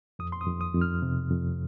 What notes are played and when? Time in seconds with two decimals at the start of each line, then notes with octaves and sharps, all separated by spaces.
0.19 F2 D#6
0.32 C6
0.41 D#6
0.47 F2
0.61 D#6
0.75 F2
0.82 F6
1.02 C3
1.31 F2